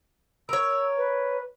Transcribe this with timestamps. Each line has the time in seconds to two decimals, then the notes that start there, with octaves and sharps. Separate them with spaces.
0.49 A#4 C#5 E6
0.97 B4